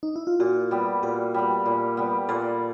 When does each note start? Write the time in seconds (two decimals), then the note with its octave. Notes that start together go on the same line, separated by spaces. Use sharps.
0.03 D#4
0.16 E4
0.27 F4
0.40 A#2 F#4
0.71 G3 B3
1.03 A#2 G4
1.34 G3 B3
1.66 A#2
1.97 G3 B3
2.28 A#2 A4